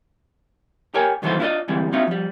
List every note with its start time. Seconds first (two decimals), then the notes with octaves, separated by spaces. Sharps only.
0.94 G4 A#4 C#5 G5 G#5
1.22 G2 D#3 E3 F#3 A4 C5
1.39 D4 E4 F4 A4 D5 D#5
1.68 D2 G#2 E3 G3 G#3 C4
1.92 C4 D4 D#4 F4 F#4 E5
2.07 F3 G3